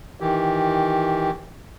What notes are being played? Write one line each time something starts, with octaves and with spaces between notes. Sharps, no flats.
D#3 E3 G4